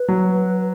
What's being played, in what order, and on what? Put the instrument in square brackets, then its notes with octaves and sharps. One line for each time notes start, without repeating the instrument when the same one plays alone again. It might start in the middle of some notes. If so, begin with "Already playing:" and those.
Already playing: [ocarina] B4
[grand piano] F#3